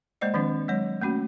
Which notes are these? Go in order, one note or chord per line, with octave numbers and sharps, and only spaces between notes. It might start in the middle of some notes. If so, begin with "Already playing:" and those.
G#3 A#3 C5 D5 D#5
D#3 F3 G#3 C4 D4
F#3 G#3 C#5
A3 A#3 C#4 F#4